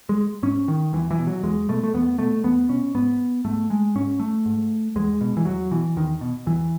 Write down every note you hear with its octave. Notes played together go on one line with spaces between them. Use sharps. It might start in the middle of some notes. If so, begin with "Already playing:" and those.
G#3
G#2 C#4
D#3
E2 E3
E3
B2
F#3
E2 G#3
B2 A3
A3
E2 B3
B2 A3
E2 B3
B2 C#4
G#2 B3
G#2 A3
G#3
G#2 C#4
A3
G#2
E2 G#3
B2
E3
E2 F#3
B2 E3
E2 D#3
B2
E2 E3